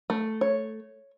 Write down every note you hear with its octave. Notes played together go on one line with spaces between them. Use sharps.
A3
C#5